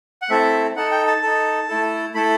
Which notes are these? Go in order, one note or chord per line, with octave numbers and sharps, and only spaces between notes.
F#5
A3 C4 E4 A4 E5
D#4 A4 F#5
G5
A5
D#4 A4
A3 E4 A4
A3 E4 A4 B5